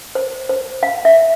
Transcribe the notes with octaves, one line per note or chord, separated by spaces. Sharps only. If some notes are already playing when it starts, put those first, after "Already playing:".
C5
C5
F5
E5